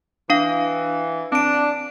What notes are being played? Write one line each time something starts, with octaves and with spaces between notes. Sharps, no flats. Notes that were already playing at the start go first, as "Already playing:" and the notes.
E3 D4 F5
C4 D4 D7